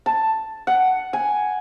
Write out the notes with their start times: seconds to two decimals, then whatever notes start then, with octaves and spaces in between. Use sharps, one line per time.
0.06 A5
0.67 F#5
1.13 G#5